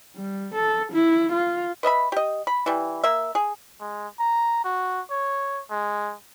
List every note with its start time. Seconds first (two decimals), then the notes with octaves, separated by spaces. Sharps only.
0.15 G3
0.55 A4
0.92 E4
1.32 F4
1.83 B4 D#5 E5 B5
2.12 G4 D#5
2.47 B5
2.66 E3 G3
3.04 A#3 E5
3.35 G#4
3.80 G#3
4.19 A#5
4.64 F#4
5.10 C#5
5.70 G#3